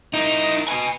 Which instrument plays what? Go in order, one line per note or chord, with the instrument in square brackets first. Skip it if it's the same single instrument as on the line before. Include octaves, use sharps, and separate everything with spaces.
[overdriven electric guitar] D#4 [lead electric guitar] E4 A#4
[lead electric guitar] B4 D#5 [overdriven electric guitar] G#5